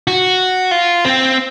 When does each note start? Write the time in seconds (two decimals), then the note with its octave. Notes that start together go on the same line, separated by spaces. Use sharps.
0.07 F#4
0.71 F4
1.05 C4